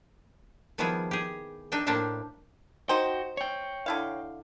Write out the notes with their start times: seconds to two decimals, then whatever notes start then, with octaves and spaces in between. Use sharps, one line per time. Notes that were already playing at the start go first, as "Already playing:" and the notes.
0.78 D#3 F3 G3 B3 E4 G#4
1.11 G4 G#4
1.72 D4 D#4 E5 G5
1.86 A2 A#3 D4 G4 C5 E5
2.89 D#4 F#4 C5 G5
3.37 C#5 G5
3.86 D3 E4 F5